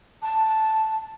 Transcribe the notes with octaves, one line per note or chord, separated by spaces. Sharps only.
A5